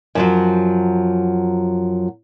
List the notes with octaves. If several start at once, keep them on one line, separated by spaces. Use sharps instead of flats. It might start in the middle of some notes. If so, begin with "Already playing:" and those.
F#2 F3 F#3